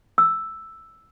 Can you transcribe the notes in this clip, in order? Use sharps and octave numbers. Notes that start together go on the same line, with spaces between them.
E6